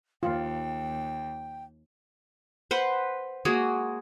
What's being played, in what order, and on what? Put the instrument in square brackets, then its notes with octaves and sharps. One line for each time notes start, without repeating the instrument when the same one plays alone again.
[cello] D#2 [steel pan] F4 [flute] G5
[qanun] B4 C5 F#5
G#3 A#3 F#4 G#4